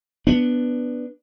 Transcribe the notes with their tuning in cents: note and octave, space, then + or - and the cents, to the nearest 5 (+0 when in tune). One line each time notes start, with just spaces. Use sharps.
B3 +0 D4 +0